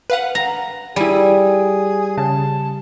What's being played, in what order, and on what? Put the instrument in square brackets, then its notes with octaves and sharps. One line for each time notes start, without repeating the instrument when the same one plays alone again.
[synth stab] B4 F5 F#5
[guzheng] A#5
[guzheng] G3 [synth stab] E4 D#7 [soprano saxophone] G#4
[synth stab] C#3 [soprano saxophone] A5